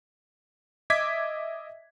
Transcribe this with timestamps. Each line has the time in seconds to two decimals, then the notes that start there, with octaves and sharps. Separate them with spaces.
0.90 D#5 E5 D6 G#6 B6